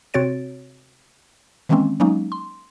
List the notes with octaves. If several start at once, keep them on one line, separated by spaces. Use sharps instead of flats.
C3 C4 F#4 C#5 A6 D7
D#3 E3 G#3 A#3 C4 C#4
F#3 G#3 A#3 C#4 D#4
C6